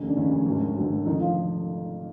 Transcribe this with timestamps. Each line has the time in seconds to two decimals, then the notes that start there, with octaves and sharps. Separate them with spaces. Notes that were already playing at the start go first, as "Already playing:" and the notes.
Already playing: F1 D#2 C#3
0.08 D4
0.16 F1 D#2 C#3 C#4
0.31 C#3 C#4
0.46 G#1 F#2 D3 F#3
0.76 G#1 F#2 D3 F#3
1.05 F1 F2 D3 D#3 D#4
1.20 F3 F4